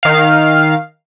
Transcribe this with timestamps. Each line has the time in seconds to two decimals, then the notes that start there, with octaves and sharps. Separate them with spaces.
0.03 D#3 F5